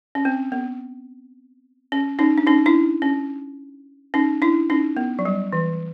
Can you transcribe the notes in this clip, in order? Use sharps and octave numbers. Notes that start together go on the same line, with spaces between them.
C#4
C4
B3
C#4
C#4 D#4
D4
C#4 D#4
D4 E4
C#4
C#4 D#4
D4 E4
C#4 D#4
B3
F#3
G3
E3